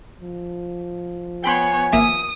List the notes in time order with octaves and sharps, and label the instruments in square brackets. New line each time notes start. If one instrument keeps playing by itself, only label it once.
[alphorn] F3
[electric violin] B3 C#5 [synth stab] G5 B5 C6 [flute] G#5
[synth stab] G#1 A#3 E5 [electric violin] D#6